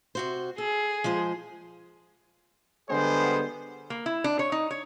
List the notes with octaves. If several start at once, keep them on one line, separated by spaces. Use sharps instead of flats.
C3 F#4 C5
G#4 A4
F3 G#3 C5
D3 G3 G#3 B3 G#4 C5
A#3
E4
D4
C#5
D#4
C#5